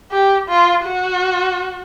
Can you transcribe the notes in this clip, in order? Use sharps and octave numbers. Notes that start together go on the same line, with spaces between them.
G4
F4
F#4